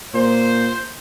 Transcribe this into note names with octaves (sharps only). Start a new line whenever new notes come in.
A#2 C5